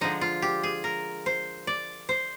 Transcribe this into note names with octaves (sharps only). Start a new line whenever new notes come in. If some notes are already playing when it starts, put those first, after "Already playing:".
D3 F3 G#3 D#4
F4
G4
G#4
A#4
C5
D5
C5